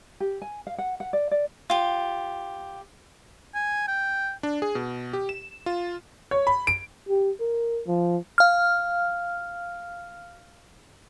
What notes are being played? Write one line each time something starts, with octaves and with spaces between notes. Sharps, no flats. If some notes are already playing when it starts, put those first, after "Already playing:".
G4
G#5
F5
F#5
F#5
D5
D5
F4 G4
G#5
G5
D4
G#4
B2
G4
E7
F4
C#5
B5
D7
G4
A#4
F3
F5 F6